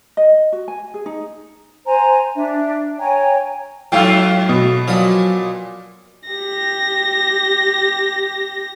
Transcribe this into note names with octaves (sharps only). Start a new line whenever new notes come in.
D#5
F#4
G#5
G#4
D#4
C5 G#5 A#5
D4 E5
C#5 G5 G#5 A#5
G#2 F#3 F4 A4 F5 G5
B2
A#2 F3 F#3 D#6
G4 A#6